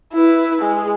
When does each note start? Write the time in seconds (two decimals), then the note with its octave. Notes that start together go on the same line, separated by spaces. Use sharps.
0.13 E4 B4
0.61 G#3